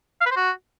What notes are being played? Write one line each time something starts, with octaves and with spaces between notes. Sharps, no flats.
F5
B4
C5
F#4